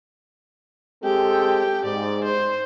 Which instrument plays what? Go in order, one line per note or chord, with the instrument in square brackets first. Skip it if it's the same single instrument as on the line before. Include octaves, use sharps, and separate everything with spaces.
[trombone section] G#3 C4 A4 [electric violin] G4 G5
[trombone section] G#2 [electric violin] D5
[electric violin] C5